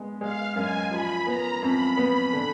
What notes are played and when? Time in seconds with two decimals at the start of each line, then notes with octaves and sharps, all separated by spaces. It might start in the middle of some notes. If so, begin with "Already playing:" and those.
Already playing: G#3 B3
0.21 G#3 F5
0.56 F#2 G#5
0.91 F3 B5
1.27 B3 A#5
1.62 F2 B5
1.97 B3
2.33 D3